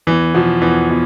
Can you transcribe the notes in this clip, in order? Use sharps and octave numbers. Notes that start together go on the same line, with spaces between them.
E2 E3
B2 F3
E2 E3
B2